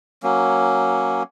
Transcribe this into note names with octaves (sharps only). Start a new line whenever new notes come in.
F#3 A#3 C#4